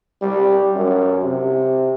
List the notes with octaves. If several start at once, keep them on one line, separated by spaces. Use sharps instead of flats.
G3
F#2
C3